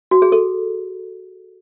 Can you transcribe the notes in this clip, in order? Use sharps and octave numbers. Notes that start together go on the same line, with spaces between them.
F#4
G#4
A4